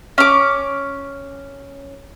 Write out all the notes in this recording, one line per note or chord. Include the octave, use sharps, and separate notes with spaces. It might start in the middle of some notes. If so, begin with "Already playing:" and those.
C#4 D6